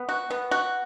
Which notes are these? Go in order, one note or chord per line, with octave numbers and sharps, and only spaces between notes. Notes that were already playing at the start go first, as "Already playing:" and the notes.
Already playing: B3
F#4
B3
F#4